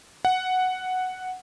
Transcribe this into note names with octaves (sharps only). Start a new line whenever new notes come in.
F#5